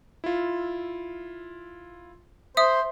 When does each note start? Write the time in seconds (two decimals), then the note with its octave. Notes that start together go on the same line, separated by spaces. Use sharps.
0.24 E4 F4
2.57 C5 E5 D#6